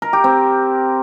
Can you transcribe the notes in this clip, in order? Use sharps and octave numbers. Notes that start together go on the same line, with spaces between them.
A#4
G4
C4